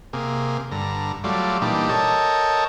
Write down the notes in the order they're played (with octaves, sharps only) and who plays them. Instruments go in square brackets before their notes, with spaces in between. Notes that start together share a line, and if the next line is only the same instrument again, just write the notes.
[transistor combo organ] C3 A#3 G#4
G2 D3 A#5
F#3 G3 A3 F4 D5
A#2 E3 G3 D4 D#4 G4
A4 A#4 C#5 D#5 G5 A5